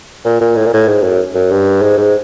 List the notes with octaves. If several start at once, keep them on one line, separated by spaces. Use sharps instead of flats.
A#2
A#2
A2
A#2
A2
G#2
F#2
F#2
G2
G#2
G#2